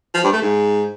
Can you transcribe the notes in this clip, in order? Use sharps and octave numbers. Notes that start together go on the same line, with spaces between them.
F3
G2
A3
G#2